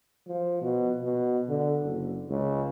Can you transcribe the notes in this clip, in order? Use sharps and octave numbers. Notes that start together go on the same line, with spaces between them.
F3
B2
B2
D3
F#1
C#2